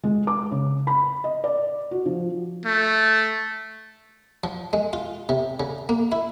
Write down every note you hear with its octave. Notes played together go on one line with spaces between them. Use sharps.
G#3
D6
C#3
B5
D#5
D5
F#4
F3
A3
F3
G#3
F4
C3
C#3
A#3
E4